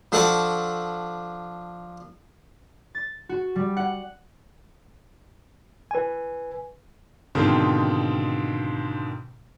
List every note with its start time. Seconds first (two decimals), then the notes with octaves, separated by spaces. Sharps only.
0.12 F3 D4 A4 F#5 C#6 D6
2.95 A6
3.29 F#4
3.56 G3
3.77 F#5
5.91 B4 G#5
7.35 G#2 B2 D3 D#3 C4 F4